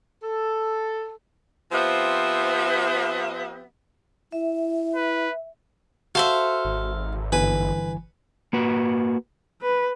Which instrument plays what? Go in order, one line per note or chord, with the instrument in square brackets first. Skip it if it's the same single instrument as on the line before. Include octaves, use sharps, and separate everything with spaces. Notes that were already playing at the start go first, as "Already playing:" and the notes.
[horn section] A4
[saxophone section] F3 B3 C4 G4 E5
[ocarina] E4 [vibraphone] E5
[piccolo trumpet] B4
[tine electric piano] F#4 [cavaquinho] A4 C5 E5 [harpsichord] F5
[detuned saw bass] G#1
[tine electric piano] G1 E3 G#5 [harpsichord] B4
[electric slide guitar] A#3 F#4 B4
[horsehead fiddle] B4